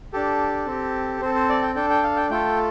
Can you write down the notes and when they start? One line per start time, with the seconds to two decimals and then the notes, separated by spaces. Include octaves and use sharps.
0.13 D4 G4 A4
0.66 C4 G4
1.21 C4 A4 C5
1.35 C5
1.49 D5
1.62 G5
1.75 D4 A4 G5
1.90 G5
2.03 F5
2.16 G5
2.30 A3 F4 A4 G5